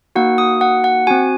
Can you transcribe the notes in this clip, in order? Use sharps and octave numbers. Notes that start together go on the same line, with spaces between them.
A#3 D#4 F#4 F#5
D#6
F#5
F#5
C4 F#4 G#5